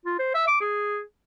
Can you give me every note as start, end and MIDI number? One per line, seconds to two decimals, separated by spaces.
0.06 0.16 65
0.19 0.30 72
0.34 0.46 76
0.47 0.57 86
0.61 1.01 68